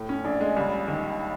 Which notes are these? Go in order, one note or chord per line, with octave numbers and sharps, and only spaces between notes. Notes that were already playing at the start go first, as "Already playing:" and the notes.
Already playing: A2
C#4
A#1 D4
G#3
C#2 G3
D#3